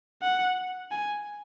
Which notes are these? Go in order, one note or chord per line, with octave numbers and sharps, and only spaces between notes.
F#5
G#5